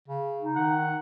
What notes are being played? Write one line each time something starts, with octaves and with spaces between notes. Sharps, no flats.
C#3
D#4
D#3 F#5